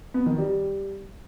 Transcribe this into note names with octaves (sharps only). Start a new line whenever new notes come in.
B3
D#3
G3